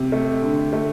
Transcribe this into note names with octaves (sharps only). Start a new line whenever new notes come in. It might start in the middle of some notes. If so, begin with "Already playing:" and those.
Already playing: C3
A3
D3
A3